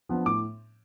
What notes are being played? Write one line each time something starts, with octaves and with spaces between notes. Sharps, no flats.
F3 B3 D4
A2 D6